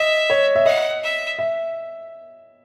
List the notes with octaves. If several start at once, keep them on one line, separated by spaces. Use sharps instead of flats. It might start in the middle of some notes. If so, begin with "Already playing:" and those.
Already playing: D#5 E5
C#5
E5
D#5 F#5
E5
E5